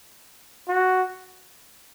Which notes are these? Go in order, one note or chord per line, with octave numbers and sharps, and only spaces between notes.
F#4